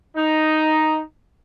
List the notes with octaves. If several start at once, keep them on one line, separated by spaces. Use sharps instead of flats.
D#4